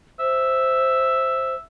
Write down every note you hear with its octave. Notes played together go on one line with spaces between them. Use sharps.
C5 E5